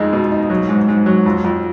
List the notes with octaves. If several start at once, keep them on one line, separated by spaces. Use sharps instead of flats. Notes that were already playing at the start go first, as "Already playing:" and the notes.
Already playing: F2 G#3 D#4
B2
D#4
F#3
G#2
G#2
F#3
F2
F2